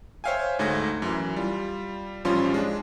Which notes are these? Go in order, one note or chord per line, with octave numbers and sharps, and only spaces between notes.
C5 C#5 E5 F5 G5 G#5
D2 G#2 A3 G#4 G#6 A#6
F#2 E3
G3 F4
A1 F3 G3 C#4 F4 C6
G#3 D4